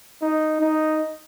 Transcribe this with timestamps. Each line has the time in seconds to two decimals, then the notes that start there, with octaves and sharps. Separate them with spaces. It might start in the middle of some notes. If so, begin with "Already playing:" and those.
0.22 D#4
0.61 D#4